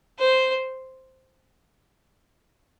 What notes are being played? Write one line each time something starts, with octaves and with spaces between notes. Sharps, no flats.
C5